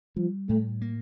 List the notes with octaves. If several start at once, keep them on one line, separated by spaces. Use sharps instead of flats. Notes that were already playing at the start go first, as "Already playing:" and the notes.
F3 G3
A2 A3
A#3